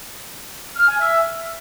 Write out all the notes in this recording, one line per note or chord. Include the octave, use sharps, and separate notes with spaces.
F6
G#5
E5